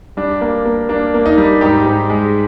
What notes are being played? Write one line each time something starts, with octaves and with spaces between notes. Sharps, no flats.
G3 D4
A#3
A#3
A#3 D4
A#3
D#4
G3
G#2 D#4 G4
G#2
G#3